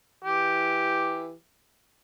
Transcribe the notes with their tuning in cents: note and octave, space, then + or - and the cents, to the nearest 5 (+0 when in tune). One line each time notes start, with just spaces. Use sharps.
E3 +0 G4 +0